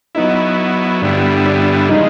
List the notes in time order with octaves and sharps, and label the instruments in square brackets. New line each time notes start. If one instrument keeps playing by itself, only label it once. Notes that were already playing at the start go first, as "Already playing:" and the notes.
[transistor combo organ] F#3 B3 E4 [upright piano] D#4
[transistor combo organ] G2 D3 G3 B3 E4 [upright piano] D4
[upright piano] D4
[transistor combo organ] C#3 F3 G#3 [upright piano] D#4